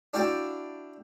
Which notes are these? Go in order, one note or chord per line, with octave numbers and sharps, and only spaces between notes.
D4 E4 F#4 F5 G5 A5